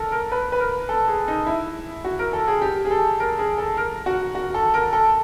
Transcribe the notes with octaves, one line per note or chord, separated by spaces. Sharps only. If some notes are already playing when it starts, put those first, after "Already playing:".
Already playing: A4 A#4
A#4
B4
B4
A#4
A4
G#4
D#4
E4
F#4
A#4
A4
G#4
G4
G#4
A4
A#4
G#4
A4
A#4
F#4
F#4
A4
A#4
A4